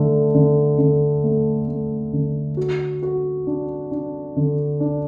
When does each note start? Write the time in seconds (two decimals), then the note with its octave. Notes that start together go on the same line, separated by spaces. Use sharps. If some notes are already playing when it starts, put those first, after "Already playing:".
Already playing: D3 A3
0.35 D3
0.78 D3
1.24 A3
1.68 A3
2.13 D3
2.57 F#4
3.03 F#4
3.47 D4
3.91 D4
4.36 D3
4.80 D4